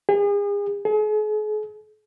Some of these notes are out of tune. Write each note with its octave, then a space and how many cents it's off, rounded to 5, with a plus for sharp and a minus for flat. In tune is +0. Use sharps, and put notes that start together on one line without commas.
G#4 -40
G#4 +40